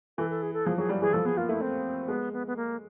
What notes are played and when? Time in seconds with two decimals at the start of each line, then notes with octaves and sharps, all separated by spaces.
0.18 E3 A4
0.30 A4
0.42 G#4
0.53 A4
0.66 F3 G#4
0.78 F#3 G#4
0.89 G3
1.01 E3 G#4
1.13 F3 A4
1.25 B3 G#4
1.37 A#3 F4
1.49 A3 E4
1.61 C4
2.08 G#3 B3
2.33 B3
2.47 B3
2.56 A#3